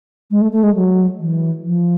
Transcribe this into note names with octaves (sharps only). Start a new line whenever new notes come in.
G#3
A3
A3
G#3
F#3
E3
F3